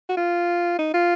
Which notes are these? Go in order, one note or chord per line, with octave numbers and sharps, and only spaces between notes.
F#4
F4
D#4
F4